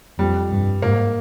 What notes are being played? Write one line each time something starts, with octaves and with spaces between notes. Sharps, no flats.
F2 G3
G2
G#2 A#3